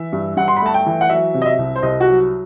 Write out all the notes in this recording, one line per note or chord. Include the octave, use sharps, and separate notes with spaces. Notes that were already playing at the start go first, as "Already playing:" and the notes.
Already playing: E3 E5
G2
G2 F#5
C6
B5
A3 A5
G5
E3
F#5
F#3 E5
C3
D#5
E5
C2
C5
C2 D#5
F#4
F#3